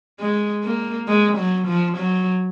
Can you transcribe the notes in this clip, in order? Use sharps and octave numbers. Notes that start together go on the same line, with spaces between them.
G#3
A#3
G#3
F#3
F3
F#3